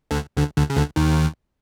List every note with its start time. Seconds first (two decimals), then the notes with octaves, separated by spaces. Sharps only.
0.11 D2 D3
0.37 D2 D3
0.57 D2 D3
0.70 C#3
0.77 D2 D3
0.96 D#2 D#3